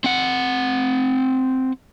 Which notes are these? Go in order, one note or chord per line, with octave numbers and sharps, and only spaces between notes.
C4 F#5